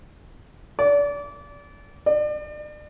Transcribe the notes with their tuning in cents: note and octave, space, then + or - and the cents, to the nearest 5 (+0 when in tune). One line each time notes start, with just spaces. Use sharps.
D5 -30
D5 +35